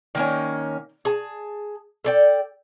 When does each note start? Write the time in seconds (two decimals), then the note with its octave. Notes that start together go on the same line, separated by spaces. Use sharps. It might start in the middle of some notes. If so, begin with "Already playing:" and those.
0.15 D#3 A#3 C#4
1.05 G#4 A5
2.04 A4 D5 G5